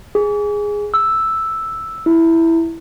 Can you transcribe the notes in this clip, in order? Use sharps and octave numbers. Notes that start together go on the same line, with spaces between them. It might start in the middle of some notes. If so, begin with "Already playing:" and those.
G#4
E6
E4